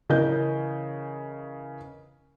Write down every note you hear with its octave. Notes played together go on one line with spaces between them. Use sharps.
C#3 E3 A#4 D#5 G6